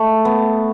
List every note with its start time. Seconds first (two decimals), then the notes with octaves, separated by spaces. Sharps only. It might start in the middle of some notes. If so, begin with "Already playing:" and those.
Already playing: A3
0.25 B3